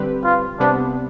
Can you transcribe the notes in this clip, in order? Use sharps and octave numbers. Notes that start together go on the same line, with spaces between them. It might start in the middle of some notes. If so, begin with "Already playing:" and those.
Already playing: D3 G3 C4 G4 B4
F4
C3 G3 B3 D4